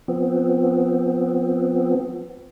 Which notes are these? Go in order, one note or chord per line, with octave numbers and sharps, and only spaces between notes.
F3 B3 C4